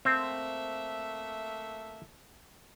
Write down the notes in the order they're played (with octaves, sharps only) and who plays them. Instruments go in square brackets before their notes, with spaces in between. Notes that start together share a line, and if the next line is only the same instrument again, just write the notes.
[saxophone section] A3 A#3 E5 [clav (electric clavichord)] C4